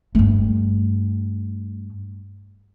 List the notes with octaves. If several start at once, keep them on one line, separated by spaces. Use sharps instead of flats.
G2 A3